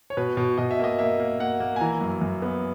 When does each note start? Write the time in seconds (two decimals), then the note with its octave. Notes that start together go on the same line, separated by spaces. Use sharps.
0.10 C#5
0.17 B2 B4
0.37 B2
0.58 B2 D#5
0.71 E5
0.79 A#3 D#5
0.99 A#3 E5
1.20 A#3
1.39 A#3 F#5
1.60 A#3
1.76 G#5
1.81 E3 A#5
2.01 F#2
2.21 F#2
2.42 B3